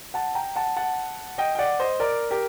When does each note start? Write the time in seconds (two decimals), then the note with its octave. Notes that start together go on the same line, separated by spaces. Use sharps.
0.14 F#5 A5
0.35 G5 A#5
0.56 F#5 A5
0.76 F#5 A5
1.38 D#5 G5
1.55 G5
1.59 D5 F#5
1.80 C5 D#5
2.00 A#4 D5
2.31 G4 A#4